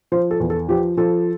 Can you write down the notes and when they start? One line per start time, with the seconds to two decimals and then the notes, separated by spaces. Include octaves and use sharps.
0.12 F3 C5
0.31 A4
0.40 E2
0.50 A4
0.69 F3 G4
0.97 F3 A4